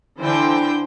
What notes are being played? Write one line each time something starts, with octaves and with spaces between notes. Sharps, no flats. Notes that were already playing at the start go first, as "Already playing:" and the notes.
D3 E3 C5 G5